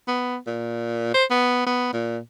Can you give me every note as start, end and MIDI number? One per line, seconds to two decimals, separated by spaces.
0.08 0.38 59
0.47 1.10 46
1.14 1.24 72
1.31 1.63 59
1.67 1.89 59
1.93 2.19 46